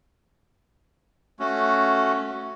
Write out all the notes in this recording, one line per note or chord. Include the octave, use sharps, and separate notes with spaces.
A3 C#4 F#4